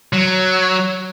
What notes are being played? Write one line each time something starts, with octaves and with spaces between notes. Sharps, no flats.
F#3